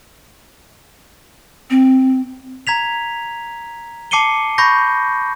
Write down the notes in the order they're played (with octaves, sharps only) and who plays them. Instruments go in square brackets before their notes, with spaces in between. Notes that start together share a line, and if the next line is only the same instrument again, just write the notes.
[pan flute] C4
[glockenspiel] A#5 G#6 B6 F7
A5 D6 C7 C#7 D#7 G7
B5 C#6 G6 A#6